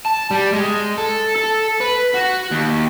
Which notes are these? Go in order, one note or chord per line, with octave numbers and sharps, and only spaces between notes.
A5
G3
G#3
A4
A4
B4
F#4
D#2